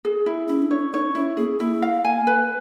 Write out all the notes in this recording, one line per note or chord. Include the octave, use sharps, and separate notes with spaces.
G#4
E4
C#4 E4
D4
C#5
C#4
D#4 C#5
C#4 E4
A#3 G#4
A#3 E4
F5
G#5
B4